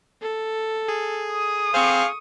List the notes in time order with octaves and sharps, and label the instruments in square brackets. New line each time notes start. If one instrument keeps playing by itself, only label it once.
[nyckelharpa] A4
[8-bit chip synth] G#4
[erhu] D#6
[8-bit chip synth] C4 C5 [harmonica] G#4 F5 [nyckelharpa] C#6